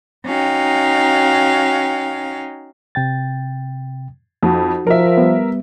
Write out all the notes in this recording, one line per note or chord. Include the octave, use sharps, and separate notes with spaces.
C#4 D#4 F#4 F5 G5
C3 G5 A6
F2 D#4 F#4
F3 A#4 E5
G3 B3